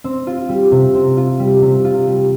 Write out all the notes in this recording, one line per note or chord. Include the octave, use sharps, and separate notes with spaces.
C4
F4
G3
C3
C4
F4
G3
C3
F4
G3